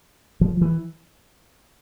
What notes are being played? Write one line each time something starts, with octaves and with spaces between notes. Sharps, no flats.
F3
E3